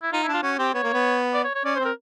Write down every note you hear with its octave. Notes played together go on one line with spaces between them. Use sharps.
E4
D#4 F4
E4
D4
F4
C#4 F#4
C4 G4
B3 C#5
A#3
B3
D5
C#5
C#5
C#4 D5
C5
C4
A#4